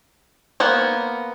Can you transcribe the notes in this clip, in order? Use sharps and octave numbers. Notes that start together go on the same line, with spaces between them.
A#3 B3 C5 F#5